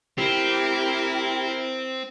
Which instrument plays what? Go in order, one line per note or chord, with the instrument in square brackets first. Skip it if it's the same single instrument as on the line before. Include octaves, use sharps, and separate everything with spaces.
[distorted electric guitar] C4 [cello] E4 A#4 [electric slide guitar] G4